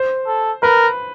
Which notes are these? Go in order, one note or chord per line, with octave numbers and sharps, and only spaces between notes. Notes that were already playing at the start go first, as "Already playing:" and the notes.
Already playing: C5
A4
A#4 B4